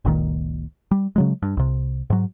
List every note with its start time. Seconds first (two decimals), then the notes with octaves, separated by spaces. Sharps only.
0.05 F#1 C#2 A#2 D#3
0.91 G3
1.16 C#3 F#3 G#3
1.43 G2
1.57 C2 C3
2.10 G#2 F#3